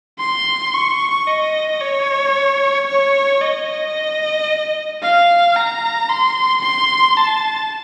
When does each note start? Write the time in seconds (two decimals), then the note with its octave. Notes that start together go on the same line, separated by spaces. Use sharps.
0.20 C6
0.75 C#6
1.28 D#5
1.81 C#5
2.88 C#5
3.41 D#5
5.03 F5
5.56 A#5
6.09 C6
6.62 C6
7.17 A5